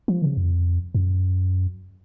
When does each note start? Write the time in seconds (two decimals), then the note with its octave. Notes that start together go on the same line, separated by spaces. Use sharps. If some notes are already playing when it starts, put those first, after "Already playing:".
0.08 F3
0.22 D#3
0.26 C#3
0.37 F#2
0.43 F2
0.95 F#2